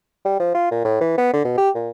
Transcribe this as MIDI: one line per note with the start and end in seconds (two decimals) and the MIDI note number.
0.25 0.36 55
0.40 0.53 53
0.54 0.67 65
0.71 0.81 46
0.85 1.01 45
1.01 1.18 52
1.18 1.33 59
1.33 1.44 50
1.44 1.56 47
1.58 1.69 67
1.75 1.90 46